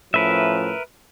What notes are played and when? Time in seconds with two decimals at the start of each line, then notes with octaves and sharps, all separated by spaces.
0.14 A2 F3 C#4 A#4 B4 E5